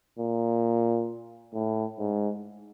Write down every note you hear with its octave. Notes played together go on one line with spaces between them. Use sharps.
A#2
A2
G#2